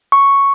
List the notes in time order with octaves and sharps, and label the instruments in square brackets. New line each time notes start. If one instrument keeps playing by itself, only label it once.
[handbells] C#6